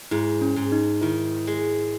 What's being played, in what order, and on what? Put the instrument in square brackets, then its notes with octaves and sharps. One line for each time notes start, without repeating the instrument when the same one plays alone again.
[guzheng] G#2 [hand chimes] E4
[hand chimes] C#4
[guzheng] G#2
[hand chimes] D#4
[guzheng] D#3 [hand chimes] E4
[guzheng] G#3